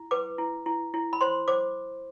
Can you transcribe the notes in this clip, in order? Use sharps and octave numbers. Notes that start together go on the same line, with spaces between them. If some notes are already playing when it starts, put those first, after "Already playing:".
Already playing: E4
B4 D6
E4
E4
E4
B5
C5 C6
C5 D6